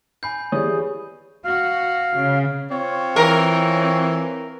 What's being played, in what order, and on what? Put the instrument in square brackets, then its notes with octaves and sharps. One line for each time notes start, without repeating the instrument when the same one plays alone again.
[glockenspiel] G#5 B5 G6 [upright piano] C7
[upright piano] E3 D5 [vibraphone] G4 G#4 [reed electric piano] C#5 D#6
[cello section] F#4 [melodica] F5
[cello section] C#3
[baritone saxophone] C4 [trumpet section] F4 C#5
[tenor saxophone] E3 [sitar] A#4